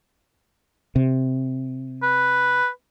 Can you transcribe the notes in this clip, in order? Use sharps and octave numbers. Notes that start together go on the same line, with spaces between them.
C3
B4